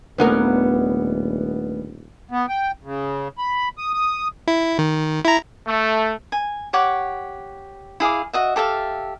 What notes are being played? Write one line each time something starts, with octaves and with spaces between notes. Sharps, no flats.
D#1 D#2 A3 B3 D4 A#4 B4
B3
G5
C#3
B5
D#6
D#6
E4
D#3
E4 A#5
A3
G#5
G4 C#5 F#5 D6
E4 G#4 F5 D6
F#4 D#5 E5
G4 A4 E5 F5